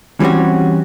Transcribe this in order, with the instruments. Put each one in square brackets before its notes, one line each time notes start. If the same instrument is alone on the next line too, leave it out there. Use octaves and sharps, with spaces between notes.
[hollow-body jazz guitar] E3 G3 C4 C#4 F#4